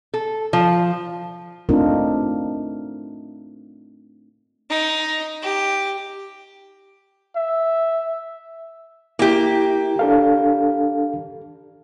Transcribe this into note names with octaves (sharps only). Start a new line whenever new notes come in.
A4
F3
A3 C4 D4 D#4 F4 A#4
D#4
G4
E5
A#3 E4 G4
D4 A4 F5